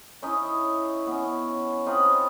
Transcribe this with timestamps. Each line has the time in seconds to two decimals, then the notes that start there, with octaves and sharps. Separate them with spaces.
0.22 C#4 D#4 E4 D#5
1.07 B3 C#4
1.86 C4 D#4 F4 B4